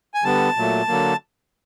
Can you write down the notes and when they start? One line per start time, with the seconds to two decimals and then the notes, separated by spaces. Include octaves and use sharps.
0.14 G#5
0.23 D3 G3 B3 A5
0.56 A#2 F#3 A3
0.88 D3 F#3 A#3